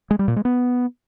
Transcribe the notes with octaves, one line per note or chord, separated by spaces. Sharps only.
G#3
G3
A#2
G#3
B3